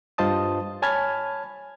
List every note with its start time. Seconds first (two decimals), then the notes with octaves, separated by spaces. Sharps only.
0.18 G2 F4 C5 D#5 A5 D#6
0.82 C#5 G#5 A5 B5 F6 G#6